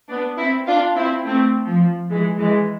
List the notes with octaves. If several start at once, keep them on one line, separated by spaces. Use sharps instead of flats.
B3 D4
C4 E4
D4 F4
C4 E4
A3 C4
F3
E3 G#3
E3 G#3